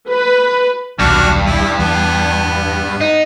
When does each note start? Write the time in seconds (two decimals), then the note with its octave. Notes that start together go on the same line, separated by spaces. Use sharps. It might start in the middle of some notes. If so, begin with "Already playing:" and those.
0.10 B4
0.99 D#1 B1 G2 D4 F#4 F6
1.46 E4
1.79 E2 B3
3.01 D#4